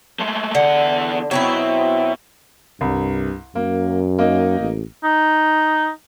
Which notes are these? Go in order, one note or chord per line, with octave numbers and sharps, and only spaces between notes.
G#3 A3
E2 D3 F#5
B2 F#3 C4 E4
C2 G2
F#2 A#3
A#3 D#4
A1
D#4